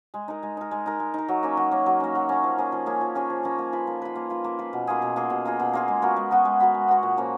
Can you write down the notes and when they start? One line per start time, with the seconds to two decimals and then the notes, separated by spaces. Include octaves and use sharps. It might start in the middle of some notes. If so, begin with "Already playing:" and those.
0.14 G#3
0.28 D#4 A#4
0.43 G#3
0.57 D#4 A#4
0.71 G#3
0.86 D#4 A#4
1.00 G#3
1.14 D#4 A#4
1.28 F#3
1.43 A#3 C#4
1.57 F#3
1.71 A#3 C#4
1.86 F#3
2.00 A#3 C#4
2.15 F#3
2.29 A#3 C#4
2.43 F3
2.58 A#3 C#4 G#4
2.72 F3
2.86 A#3 C#4 G#4
3.01 F3
3.15 A#3 C#4 G#4
3.30 F3
3.43 A#3 C#4 G#4
3.59 A#3
3.73 F4 B4
3.87 A#3
4.02 F4 B4
4.15 A#3
4.30 F4 B4
4.44 A#3
4.59 F4 B4
4.73 B2
4.87 A#3 F4 G#4
5.02 B2
5.16 A#3 F4 G#4
5.30 B2
5.45 A#3 F4 G#4
5.60 B2
5.73 A#3 F4 G#4
5.88 G#3
6.02 B3 F#4 A#4
6.16 G#3
6.31 B3 F#4 A#4
6.45 G#3
6.60 B3 F#4 A#4
6.74 G#3
6.88 B3 F#4 A#4
7.03 A#2
7.17 F3 A#3 C#4